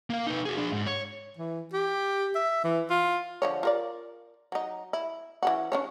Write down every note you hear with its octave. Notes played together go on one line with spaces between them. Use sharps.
A#3 F5
D#4 B4
F#4 G#4
D4 G#4
G#2
C#5
E3
G4
E5
E3
F4
D3 F3 C#5
F4 A#4 D5
F#3 D#4
E4
E3 C#4 F#4
C#4 D4 C#5